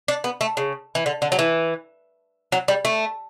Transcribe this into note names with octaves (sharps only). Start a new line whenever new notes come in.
D4
B3
A3
C#3
E3
D3
D3
F#3
E3
F#3
G3
A3